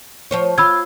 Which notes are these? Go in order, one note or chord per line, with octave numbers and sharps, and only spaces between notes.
F3 C5 C#5
F4 B5 E6 G#6